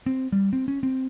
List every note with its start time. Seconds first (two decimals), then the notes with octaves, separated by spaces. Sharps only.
0.06 C4
0.32 G3
0.53 C4
0.68 C#4
0.83 C4